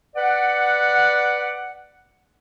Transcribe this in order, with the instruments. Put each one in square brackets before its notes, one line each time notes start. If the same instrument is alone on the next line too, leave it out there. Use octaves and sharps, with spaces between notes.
[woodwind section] B4 D5 F#5